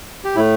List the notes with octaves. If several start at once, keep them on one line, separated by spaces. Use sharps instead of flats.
G4
A2 A3 E4